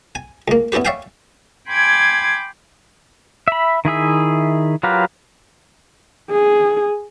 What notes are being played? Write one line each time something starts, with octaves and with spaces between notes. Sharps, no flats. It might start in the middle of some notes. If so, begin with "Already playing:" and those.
G#5
C#2 A#3
B3 C#4 E4 G4 B4
C#5 D5 E5 F5 G5 G#5
G5 G#5 B5 C6 D6 G#6
E5 B5
D#3 E4 G#4 E5
F#3 F4 G4 A#4 B4
G#4